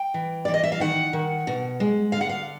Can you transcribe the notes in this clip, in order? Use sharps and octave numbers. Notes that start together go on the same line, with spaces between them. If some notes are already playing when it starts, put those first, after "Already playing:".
Already playing: G5
E3
E3 D5
D#5
E5
F5
D#3 F#5
D#3
B2
G#3
D3 F5
F#5
F5